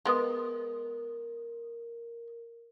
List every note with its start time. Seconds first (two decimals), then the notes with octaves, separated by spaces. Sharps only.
0.05 G#3 B3 A#4